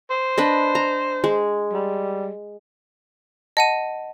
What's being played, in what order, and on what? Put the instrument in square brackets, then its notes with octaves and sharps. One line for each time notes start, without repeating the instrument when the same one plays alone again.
[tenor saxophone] C5
[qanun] D4 B4 D#5
A#5
G#3
[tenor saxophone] G3
[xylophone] D#5 F#5 D#7 [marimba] A5